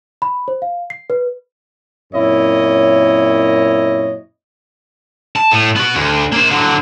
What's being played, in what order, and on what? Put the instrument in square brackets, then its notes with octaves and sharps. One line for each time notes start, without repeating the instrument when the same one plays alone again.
[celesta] B5
C5
F5
C7
B4
[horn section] F#2 A#2 C4 E4 C#5 D#5
[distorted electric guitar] A5
A2
B3 F#4
D2
A#3 C5
D3 F#3